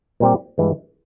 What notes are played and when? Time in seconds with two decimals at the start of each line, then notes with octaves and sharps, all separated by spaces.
0.20 A#2 G3 C4 G4
0.58 G2 E3 G#3